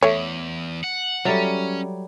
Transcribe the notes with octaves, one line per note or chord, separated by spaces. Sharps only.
E2 A3 C#5
F#5
F#3 G3 C#4 A4 D5 E5